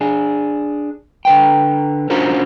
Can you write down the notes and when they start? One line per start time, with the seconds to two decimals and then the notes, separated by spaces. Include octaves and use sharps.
0.01 D4 G#4
1.25 D3 B4 G5
2.10 C#4 D4 F4 F#4 A#4 C5